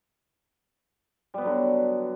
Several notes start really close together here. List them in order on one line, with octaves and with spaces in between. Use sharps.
G3 B3 F#3 D3